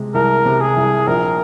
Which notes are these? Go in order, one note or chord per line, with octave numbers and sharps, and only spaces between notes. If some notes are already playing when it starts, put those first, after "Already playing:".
Already playing: C3 G#3
C2 A#4
C3
G#4
C2
A#1 A#4